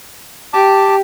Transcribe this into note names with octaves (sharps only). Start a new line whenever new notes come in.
G4 A5 D6